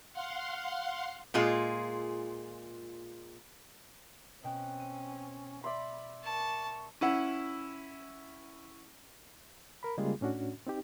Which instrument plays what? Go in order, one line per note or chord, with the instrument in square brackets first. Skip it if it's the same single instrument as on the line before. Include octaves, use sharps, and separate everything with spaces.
[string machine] F5 F#5 C6
[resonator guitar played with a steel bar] A#2 G#3 F4 G#4
[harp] B2 G5 F#6 [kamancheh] C4 C#4
[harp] D#7
[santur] D5 E5 C6 [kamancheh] B5
[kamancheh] A#4 C#6 [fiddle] A5
[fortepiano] C#4 E4 F#5
[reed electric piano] A#4 B5
C#3 G3 G#3 A#3 F4 G#4
A2 C#4 D4 F#4
C4 D#4 G4